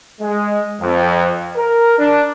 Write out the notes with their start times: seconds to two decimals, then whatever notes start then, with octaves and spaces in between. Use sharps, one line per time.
0.21 G#3
0.81 F2
1.56 A#4
1.99 D4